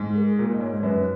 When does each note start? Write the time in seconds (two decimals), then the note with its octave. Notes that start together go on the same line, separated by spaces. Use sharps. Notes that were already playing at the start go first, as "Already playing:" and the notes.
Already playing: G#2
0.09 G#4
0.17 A#4
0.24 G#4
0.39 A#2
0.54 D#5
0.60 G#2 C#5
0.82 F#2 B4